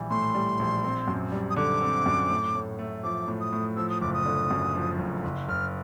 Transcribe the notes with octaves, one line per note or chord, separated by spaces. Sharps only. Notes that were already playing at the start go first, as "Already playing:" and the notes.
Already playing: A#1 E3 G3
A2 C6
G3
A#1
C4
F#2
G3
D#6
D3 D6
C4
F#2
A2
A2
A3
F3 D6
A2
D#6
A2
F3 E6
D#6
F#1 D6
D#6
D3
F#2
F3
F#1
F#1
F#1 F6